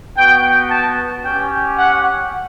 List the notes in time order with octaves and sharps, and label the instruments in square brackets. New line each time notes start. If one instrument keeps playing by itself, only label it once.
[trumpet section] B3 F#4 G5
A5
C#4 G4 G5
F#5